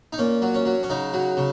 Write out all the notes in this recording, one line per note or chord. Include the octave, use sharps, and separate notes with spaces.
D#4
A#2 C#4
F#3
C#4
F#3
C#4
C#3 D#4
F#3
C#3